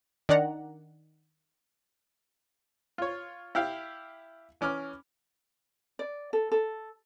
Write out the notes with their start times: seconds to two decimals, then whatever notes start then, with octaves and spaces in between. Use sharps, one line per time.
0.29 D#3 D4 D5 F#5 A#5
2.98 F4 C#5
3.55 E4 G4 F5
4.61 E3 C#4 D6 F6
5.99 D5
6.33 A4
6.52 A4